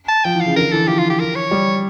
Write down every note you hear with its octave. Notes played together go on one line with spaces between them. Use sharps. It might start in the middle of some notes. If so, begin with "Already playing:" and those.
A5
F3 G5
E3
F5
C#3
D3 A#4
E3 A4
F3 G4
F4
G4
A#4
C#5
G3